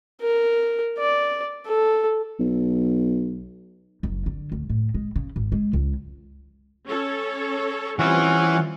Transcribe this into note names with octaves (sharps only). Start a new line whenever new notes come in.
A#4
D5
A4
B1
F#1
D3
D2
A2
G#3
C#3
G#1
G#3
C#2
C#4 A4 C#5
E3 G3 C4 C#4 F4 E5 F#5